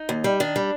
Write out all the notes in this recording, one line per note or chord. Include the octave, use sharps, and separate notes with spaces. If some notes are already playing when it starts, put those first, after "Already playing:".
Already playing: D#4
D#2
G3
D#3 D4
G3